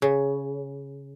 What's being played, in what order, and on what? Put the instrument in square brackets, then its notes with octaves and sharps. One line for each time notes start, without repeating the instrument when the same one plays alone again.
[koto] C#3